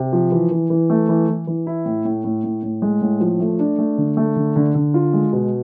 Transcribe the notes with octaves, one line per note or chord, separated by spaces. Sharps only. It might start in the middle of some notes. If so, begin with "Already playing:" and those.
Already playing: C3
F3
E3
E3
E3
A3
E3
E3
E3
E4
A2
A2
A2
A2
A2
G#3
A2
F3
A3
D4
A3
D3
A3
D3
D3
D3
F4
G#3
B2